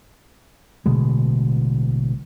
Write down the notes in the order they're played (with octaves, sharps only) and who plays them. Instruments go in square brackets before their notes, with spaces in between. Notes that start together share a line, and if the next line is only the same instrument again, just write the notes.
[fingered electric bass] A1 B2 D3 G#3